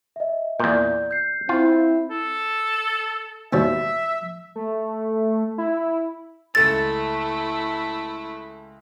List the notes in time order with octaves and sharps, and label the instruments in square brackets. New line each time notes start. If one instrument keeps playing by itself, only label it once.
[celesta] D#5 E5
[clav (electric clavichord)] E2 A#2 [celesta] D5 G6
[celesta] G6 C7
[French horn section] C4 E4 [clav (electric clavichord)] F4
[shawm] A4
[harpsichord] D#2 B2 G3 [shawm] E5
[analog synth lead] A3
E4
[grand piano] C#2 A4 E6 [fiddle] A3 E4 [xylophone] A6